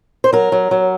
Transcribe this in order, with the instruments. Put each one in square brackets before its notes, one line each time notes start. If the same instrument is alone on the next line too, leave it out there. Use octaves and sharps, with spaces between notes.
[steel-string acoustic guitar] C5
F#3 A#4
F#3
F#3